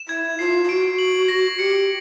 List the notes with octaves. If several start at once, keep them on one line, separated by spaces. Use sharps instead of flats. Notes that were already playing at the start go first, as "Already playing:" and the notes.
Already playing: E7
E4 G#6
F4 C7
F4
F#4 D7
F#7
A#6
G4 C#7